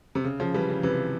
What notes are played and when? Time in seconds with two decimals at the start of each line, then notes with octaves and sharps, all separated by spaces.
0.15 C3
0.25 C#3
0.40 C#3 F3
0.54 E3 G3
0.70 C#3
0.83 C3 E3